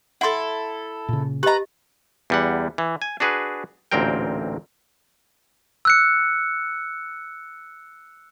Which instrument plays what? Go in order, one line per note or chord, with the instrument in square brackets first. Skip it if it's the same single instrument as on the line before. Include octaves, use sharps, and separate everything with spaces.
[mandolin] E4 A4 [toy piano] F#5 C6
[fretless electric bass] A#2 C#3
[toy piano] G4 D#5 [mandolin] B4 A#5
[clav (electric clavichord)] E2 G3 F#5
E3
G#5
D4 F#4 G#4 B4
A1 D2 A#2 C4 A#4 G5
[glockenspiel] E6 F#6 C#7